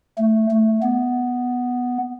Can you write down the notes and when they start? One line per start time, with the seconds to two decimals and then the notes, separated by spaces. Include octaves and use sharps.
0.18 A3
0.51 A3
0.82 B3